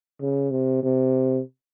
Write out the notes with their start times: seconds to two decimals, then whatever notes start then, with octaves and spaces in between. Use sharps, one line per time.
0.21 C#3
0.51 C3
0.83 C3